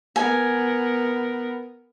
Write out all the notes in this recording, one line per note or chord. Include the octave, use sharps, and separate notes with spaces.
B3 A#4 G#5